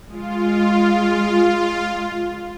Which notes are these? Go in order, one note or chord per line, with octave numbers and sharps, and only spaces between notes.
G#3 F4